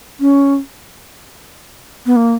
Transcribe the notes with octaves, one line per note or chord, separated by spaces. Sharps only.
C#4
B3
A#3